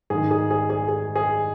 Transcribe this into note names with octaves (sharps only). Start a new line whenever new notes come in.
G#2 D#3 G#4
G#4
G#4
G#4
G#4
G#4